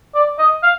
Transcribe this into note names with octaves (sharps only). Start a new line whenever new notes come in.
D5
D#5
F5